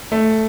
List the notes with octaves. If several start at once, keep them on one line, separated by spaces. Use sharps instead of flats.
A3